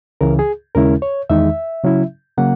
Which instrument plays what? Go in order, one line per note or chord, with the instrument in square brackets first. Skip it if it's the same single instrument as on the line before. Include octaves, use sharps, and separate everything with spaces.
[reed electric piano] C#2 C#3 E3 A#4
G#4
D#2 C#3 G#3 C#4 E4 A#4
C#5
E2 D#3 G#3 D#4 E5
C#3 F#3 C#4 E4
C#3 F#3 A#3 F#5